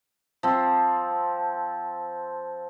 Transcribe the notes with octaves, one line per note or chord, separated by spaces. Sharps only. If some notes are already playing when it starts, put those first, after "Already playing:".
F3 C4